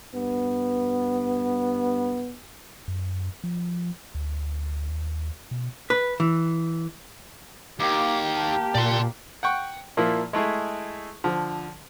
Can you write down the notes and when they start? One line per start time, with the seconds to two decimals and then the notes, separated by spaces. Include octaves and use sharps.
0.15 G2 B3
2.88 F#2
3.44 F3
4.15 D2
4.88 D#2
5.51 B2
5.90 B4
6.20 E3
7.80 D#2 A#3 G4 D6
8.36 A5
8.75 A#2 D5 C6
9.43 F#5 G5 C#6
9.97 A#2 F3 A#3 E4
10.33 G#3 A3 E4 G#4
11.24 D3 F3